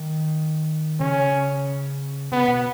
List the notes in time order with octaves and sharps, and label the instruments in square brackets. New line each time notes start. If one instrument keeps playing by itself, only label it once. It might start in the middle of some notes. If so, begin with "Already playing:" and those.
Already playing: [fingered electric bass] D#3
[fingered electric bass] C#3 [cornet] C#4
[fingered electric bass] C#3 [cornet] B3
[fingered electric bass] B2